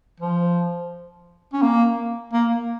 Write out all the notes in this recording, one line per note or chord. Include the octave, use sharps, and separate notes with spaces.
F3
C#4
A#3
A#3